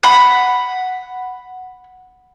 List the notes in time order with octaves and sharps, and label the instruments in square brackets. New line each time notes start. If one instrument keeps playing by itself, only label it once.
[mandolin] F#5 B5